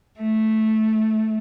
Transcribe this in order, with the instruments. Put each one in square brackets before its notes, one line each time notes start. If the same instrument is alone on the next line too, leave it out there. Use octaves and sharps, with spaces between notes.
[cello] A3